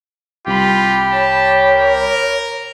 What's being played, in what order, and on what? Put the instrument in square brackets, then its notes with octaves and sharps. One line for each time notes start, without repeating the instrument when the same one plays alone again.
[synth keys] C2 B5 [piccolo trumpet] F4 [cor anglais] G4
[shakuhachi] C#5 [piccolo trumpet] A5
[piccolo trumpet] A#4